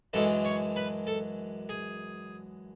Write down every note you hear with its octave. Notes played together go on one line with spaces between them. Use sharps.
F#2 E3 G#3 D4 A4
C#5
B4
A4
G#4